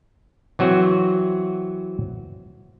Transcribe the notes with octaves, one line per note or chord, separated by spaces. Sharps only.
E3 F#3 C4 F#4